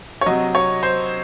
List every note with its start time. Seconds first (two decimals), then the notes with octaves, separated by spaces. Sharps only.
0.21 C#5
0.26 C3 F#3 D#5
0.55 C#5
0.83 C5